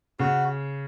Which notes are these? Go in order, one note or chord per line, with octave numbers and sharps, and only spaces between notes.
C#3 F#4